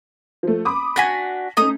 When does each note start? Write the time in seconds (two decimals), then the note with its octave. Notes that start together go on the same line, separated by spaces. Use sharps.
0.43 F3 A3
0.65 B5 D6 D#6
0.96 D4 F#4 G#5 A#6 B6
1.57 A3 C#4 D#4 A#5 D#6